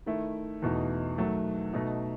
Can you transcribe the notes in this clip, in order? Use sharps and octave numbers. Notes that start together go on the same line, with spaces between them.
D#3 A3 E4
E2 B2 A3 D#4
D#3 F#3 A3
B2 A3 D#4